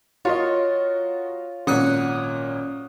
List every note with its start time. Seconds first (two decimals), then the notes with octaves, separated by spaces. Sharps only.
0.25 F4 F#4 A#4 C#5 D#5
1.67 G#1 A#2 F#3 C#4 C#5 F#5 D#6 F#6